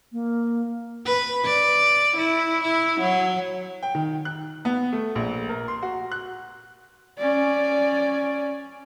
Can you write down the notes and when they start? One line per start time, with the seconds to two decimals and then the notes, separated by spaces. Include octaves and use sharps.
0.12 A#3
1.05 B4
1.45 D5
2.17 E4
2.63 E4
3.00 F#3
3.83 G5
3.95 D#3
4.25 F#6
4.65 B3
4.92 A3
5.15 A#1
5.49 A#4
5.68 C6
5.83 F#4
6.12 F#6
7.18 C#4 D5